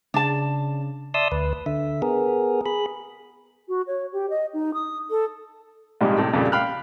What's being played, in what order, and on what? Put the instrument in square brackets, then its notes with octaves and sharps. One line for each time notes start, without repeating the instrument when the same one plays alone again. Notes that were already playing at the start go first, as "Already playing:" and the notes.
[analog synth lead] C#3 [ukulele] D4 A5
[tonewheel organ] D5 E5 A5 C6 D#6 E6
D2 B4
D3 E5
B3 G#4 A#4
G#4 B5
[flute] F#4
C#5
G4
D#5
D#4
D#6
A4
[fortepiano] A#1 G#2 C3 F3 G3 G#3
A2 C3
F2 A#2 C#3 G3
F5 G5 B5 F6 F#6